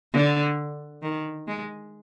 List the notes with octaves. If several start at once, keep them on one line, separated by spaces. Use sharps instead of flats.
D3
D#3
G#3